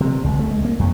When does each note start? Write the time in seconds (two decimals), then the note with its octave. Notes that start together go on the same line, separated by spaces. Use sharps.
0.01 C3
0.24 C#2
0.39 A3
0.51 G#3
0.65 A#3
0.79 F2